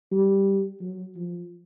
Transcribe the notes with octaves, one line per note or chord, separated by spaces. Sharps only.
G3
F#3
F3